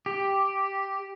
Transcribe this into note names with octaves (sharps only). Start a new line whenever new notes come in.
G4